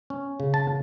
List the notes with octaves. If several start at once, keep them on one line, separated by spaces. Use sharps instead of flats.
C#4
C#3
A5